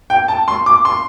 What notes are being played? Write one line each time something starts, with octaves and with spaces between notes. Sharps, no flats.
G5
A5
C6
D6
C6